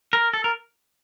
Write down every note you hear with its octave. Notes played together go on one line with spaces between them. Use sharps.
A#4
A4
A#4